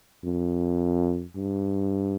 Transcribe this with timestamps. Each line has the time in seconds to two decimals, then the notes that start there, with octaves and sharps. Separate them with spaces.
0.24 F2
1.36 G2